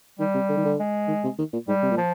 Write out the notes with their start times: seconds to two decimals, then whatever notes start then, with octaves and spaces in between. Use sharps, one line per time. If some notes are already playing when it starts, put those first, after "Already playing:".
0.19 D#3 G3
0.34 C3
0.49 D3
0.57 D#3
0.65 D3
0.79 G#3
1.08 D#3
1.24 C3
1.38 D#3
1.53 A#2
1.68 G#2 G3
1.83 C3
1.91 A#2
1.98 F3